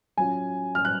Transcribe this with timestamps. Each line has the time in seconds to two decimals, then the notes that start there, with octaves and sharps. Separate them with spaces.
0.17 F#3 C#4 F4 G#5
0.75 F6
0.85 F#6